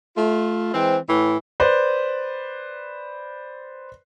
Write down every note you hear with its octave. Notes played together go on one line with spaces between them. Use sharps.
A3 F4
E3 G#3 C4
A2 E3
B4 C5 D5